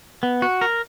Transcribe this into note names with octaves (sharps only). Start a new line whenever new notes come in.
B3
F#4
A#4